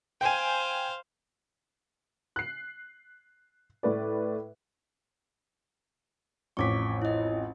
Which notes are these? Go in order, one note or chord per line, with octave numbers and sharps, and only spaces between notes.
C5 F5 G5 G#5
F#6 C7
A2 B4 D5
A1 F2 C#6 D6 B6
E4 D#5